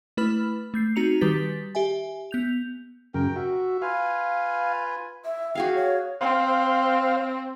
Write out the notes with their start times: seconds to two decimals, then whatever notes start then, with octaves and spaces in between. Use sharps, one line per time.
0.17 A3 E4 B4 B5 F6
0.74 A3 G6 C7
0.96 C4 D#4 F#4 A#5 C#7 F7
1.21 D#3 G3 G4 B4 A6 B6
1.75 G4 E5 G#5
2.31 B3 G6 F7
3.14 F#2 C#3 A#4 G5
3.36 F#4 E5
3.82 F4 B4 F5 G#5
5.25 E5
5.55 F#4 G#4 F5 G5
5.75 C#5
6.21 C4 C5 F5